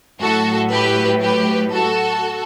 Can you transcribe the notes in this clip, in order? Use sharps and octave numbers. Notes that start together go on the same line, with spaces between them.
A2 F#3 F#4 A4
G4 B4
G4 B4
F#4 A4